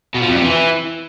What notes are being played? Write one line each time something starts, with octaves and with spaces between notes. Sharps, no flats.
B2
F3
F2
C3
E3